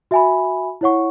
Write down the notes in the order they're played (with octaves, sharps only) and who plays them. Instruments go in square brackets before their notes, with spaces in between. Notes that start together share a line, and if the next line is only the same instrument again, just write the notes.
[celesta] F#4 E5 G#5 B5
E4 C#5 F#5 C#6